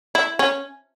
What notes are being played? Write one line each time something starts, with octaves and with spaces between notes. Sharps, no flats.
E4
C#4